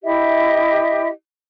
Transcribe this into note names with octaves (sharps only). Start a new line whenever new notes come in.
E4 G4 D#5 E5